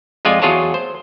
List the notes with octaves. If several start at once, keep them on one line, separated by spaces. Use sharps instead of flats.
F2 G#3 F4 D5 G#5
E2 F#3 F4 G#4 C#5 A5
C5